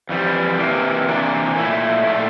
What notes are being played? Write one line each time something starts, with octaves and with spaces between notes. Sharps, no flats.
F2 E3 G3
C3 E3 A#3
C3 E3 A#3 D4
A#2 A3 E4
A#2 A3